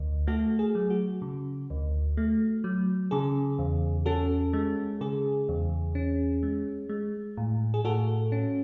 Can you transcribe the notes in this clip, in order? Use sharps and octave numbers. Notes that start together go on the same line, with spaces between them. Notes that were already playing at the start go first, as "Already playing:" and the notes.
Already playing: D2
A3 F#4 A4
G#4
F#3
F#4
C#3
D2
A3
F#3
C#3 G#4
E2
C#4 F#4 A4
G#3
C#3 G#4
E2
C#4
G#3
G#3
A2
G#4
A2 F#4 A4
C#4